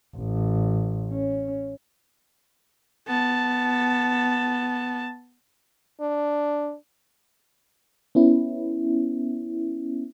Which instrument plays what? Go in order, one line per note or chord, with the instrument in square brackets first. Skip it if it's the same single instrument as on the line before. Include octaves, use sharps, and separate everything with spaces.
[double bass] A1
C#4
[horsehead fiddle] B3 A5
[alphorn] D4
[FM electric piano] B3 C#4 E4